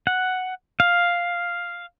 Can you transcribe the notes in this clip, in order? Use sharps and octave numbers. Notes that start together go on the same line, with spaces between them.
F#5
F5